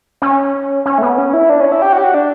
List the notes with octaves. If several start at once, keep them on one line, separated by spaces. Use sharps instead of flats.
C#4
C#4
A3
B3
C#4
E4
D4
C#4
E4
G4
F#4
G4
F#4
D4